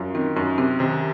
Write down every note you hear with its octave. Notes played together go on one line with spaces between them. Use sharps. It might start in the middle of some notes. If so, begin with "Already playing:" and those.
Already playing: F#2 F4
D#3 C4
F#2 C#4
C3 C4
C3 D#3